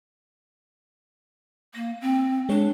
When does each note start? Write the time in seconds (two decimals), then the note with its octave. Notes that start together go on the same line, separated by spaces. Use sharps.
1.75 A#3 A#6
2.01 C4
2.49 G#3 D4 C#5